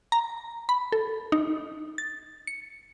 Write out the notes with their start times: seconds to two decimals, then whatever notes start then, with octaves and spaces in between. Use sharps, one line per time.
0.12 A#5
0.69 B5
0.92 A4
1.32 D#4
1.98 A6
2.47 C#7